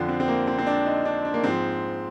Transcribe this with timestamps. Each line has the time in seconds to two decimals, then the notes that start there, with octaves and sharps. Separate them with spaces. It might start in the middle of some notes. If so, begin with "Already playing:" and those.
Already playing: F2 D3 F3
0.08 C4
0.20 C4
0.28 A#3
0.47 C4
0.58 C4
0.67 D4
0.86 D#4
1.05 D4
1.25 D4
1.34 A#3
1.44 G#2 F3 C4